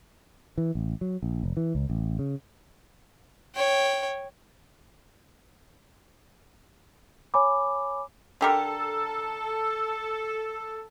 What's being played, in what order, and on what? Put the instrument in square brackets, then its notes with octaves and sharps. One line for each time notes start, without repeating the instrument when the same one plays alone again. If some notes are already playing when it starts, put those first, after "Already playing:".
[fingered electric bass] E3
A1
F#3
A#1
F1
E3
C#2
A1
C#3
[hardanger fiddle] C#5 G5
[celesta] C#5 G#5 B5 D6
[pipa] D3 G4 A#4 [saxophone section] A4